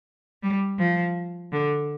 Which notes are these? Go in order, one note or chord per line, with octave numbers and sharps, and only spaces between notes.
G3
F3
D3